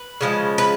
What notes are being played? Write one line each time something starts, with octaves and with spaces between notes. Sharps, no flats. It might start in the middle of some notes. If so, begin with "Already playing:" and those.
Already playing: B4
C#3 F3 G#3
B4